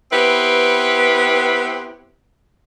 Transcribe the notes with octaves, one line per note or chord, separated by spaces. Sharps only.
B3 C4 E4 G4 B4